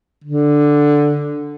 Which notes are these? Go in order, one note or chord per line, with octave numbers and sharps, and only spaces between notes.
D3